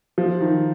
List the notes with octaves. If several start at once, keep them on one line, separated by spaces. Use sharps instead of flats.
F3
D#3